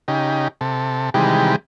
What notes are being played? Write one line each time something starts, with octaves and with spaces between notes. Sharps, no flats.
C#3 D#4 G4
C3 A4
C3 D#3 E3 G3 G#3 G4